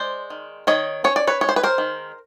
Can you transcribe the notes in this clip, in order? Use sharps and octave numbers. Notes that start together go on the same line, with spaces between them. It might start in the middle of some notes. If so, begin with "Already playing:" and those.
Already playing: G#3 C5 D5
D#3
D#3 C#5 D#5
C#4 C#5
D5
B4 C#5
G#3 C#5
C5
B4
A#4 C5
D#3